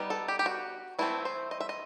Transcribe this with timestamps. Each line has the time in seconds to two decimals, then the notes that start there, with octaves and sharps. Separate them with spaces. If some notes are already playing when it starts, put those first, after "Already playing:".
Already playing: G3 B3 D#4
0.10 A4
0.28 G4
0.39 G4
0.46 F#4
0.99 E3 A3 C4 E4
1.25 C5
1.51 D#5
1.60 E5
1.69 D#5